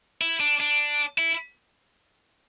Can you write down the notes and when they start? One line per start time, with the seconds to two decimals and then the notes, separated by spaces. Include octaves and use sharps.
0.21 E4
0.40 D4
0.60 D4
1.18 E4